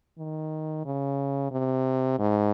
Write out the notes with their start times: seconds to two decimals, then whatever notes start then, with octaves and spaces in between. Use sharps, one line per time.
0.18 D#3
0.85 C#3
1.51 C3
2.19 G#2